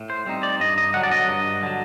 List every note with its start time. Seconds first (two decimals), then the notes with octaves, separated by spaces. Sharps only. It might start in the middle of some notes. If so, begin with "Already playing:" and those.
Already playing: A2
0.10 C5
0.26 G3 C4 D#4
0.43 D5
0.60 G2 D#5
0.78 D#5
0.94 D3 F#3 F#5
1.03 D5
1.11 D#5
1.28 G2
1.63 D3 F#3